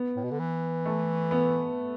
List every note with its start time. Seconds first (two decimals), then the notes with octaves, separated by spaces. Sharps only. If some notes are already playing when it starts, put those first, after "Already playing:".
Already playing: B3
0.16 A2
0.23 B2
0.31 D3
0.39 E3
0.85 A3
1.31 B3